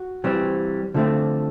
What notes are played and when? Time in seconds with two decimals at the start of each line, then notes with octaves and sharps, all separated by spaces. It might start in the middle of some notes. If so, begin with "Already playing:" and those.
Already playing: F#4
0.24 E3 G3 C4
0.94 D3 F3 A3 C4